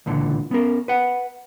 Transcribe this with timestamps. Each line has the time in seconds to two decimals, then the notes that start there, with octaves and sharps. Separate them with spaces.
0.06 C#2 A#2 D3 E3
0.51 B3 C#4 A#4
0.88 B4 F#5